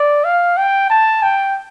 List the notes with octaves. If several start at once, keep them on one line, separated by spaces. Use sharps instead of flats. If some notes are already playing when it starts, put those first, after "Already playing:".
Already playing: D5
F5
G5
A5
G5